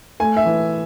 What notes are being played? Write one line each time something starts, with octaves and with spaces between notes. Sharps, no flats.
A3 G#5
E5
E3